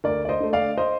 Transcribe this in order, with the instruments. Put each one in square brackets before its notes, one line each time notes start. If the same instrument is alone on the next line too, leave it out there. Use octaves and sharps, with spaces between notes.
[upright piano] D2 A#4 D5
D5
C5 D#5
D3 A3
D5 F5
C5 D#5